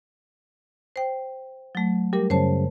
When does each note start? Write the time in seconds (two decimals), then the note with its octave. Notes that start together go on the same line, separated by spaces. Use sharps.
0.96 C5 G5
1.75 F#3 A3
2.13 G3 G4 A#4
2.30 F#2 C#3 C5 C#5 A5